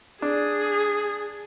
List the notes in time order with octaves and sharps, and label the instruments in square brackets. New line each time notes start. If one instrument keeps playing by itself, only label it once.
[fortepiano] D4 [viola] G#4